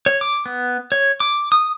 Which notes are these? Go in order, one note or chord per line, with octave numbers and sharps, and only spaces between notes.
C#5
D6
B3
C#5
D6
D#6